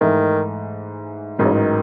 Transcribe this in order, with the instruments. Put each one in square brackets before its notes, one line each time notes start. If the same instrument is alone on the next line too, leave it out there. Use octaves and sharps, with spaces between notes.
[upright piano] G#2 E3 A3 [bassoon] D#3
[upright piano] A1 G#2 F#3 [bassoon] D#3
[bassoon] C#3
D#3